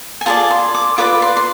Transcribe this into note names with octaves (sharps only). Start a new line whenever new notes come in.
G#5
F4 G#4 D5 A5
C6
D6
F4 B4 D5 D6
C6
C6